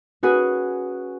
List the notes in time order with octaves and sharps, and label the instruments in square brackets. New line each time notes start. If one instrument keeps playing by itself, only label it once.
[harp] C#4 F#4 G#4 B4